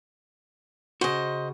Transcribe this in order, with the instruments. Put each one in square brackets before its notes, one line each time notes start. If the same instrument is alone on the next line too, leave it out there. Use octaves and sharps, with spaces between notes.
[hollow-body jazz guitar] C#3 F#4 [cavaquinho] C5 D#5